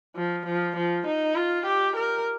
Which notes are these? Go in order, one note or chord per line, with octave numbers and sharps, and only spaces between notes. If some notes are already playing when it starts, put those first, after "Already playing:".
F3
F3
F3
D#4
F4
G4
A#4